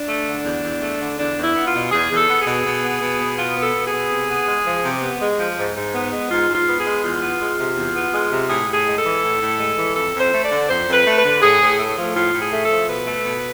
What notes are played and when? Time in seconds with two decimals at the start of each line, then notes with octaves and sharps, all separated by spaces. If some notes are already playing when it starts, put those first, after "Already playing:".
Already playing: D4
0.09 A3
0.27 D3
0.45 E2
0.64 E2
0.82 A3
1.00 D3
1.18 E2 D4
1.36 E2
1.43 E4
1.54 B3
1.67 F4
1.74 B2
1.91 E2 G#4
2.10 E2
2.16 A4
2.29 B3
2.40 G#4
2.46 B2
2.65 B2
2.83 B3
3.01 B2
3.20 B3
3.37 B2 F4
3.56 B3
3.62 A4
3.74 B2
3.87 G#4
3.92 B3
4.11 C3
4.30 B3
4.47 G#3
4.66 F3
4.84 C3
5.02 B3
5.21 G#3
5.39 F3
5.57 G#2
5.75 G#2
5.94 B3
6.11 G#3
6.30 G#2 F4
6.48 G#2
6.54 F4
6.67 B3
6.79 G#4
6.85 G#3
7.03 E2 F4
7.22 B3
7.40 G#3
7.58 C3
7.76 E2
7.95 B3
8.13 G#3
8.31 C3
8.49 A2 G#4
8.68 A2
8.74 G#4
8.87 G#3
8.98 A4
9.04 E3
9.23 A2
9.41 A2
9.59 G#3
9.77 E3
9.95 F2 A4
10.14 F2
10.20 C5
10.33 A3
10.45 D5
10.50 D3
10.69 F2 C5
10.87 F2
10.93 B4
11.06 A3
11.18 B4
11.24 D3
11.41 A2 G#4
11.61 A2
11.79 A3
11.97 F3
12.15 A2 F4
12.33 A2
12.40 G#4
12.52 A3
12.64 A4
12.71 F3
12.89 B2 B4
13.07 A3
13.25 B2